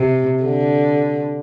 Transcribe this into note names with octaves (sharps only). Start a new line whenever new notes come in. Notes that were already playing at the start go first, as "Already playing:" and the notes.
Already playing: C3
D3